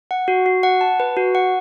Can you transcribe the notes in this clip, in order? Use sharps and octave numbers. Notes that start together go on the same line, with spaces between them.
F#5
F#4
F#4
F#5
A5
B4
F#4
F#5